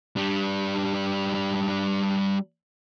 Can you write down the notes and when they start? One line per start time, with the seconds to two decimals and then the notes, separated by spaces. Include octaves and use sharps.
0.16 G3 D4